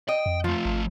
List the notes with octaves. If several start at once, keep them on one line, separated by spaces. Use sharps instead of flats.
D#5 G5
F2
F3 A3 F4
G#1